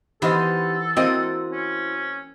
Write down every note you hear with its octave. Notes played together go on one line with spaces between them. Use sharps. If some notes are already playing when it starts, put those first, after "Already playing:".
E3 B3 D#4 G4 A4 C5 F#5 F6
A#3 C4 E4 F#4 C5 D#5
C#4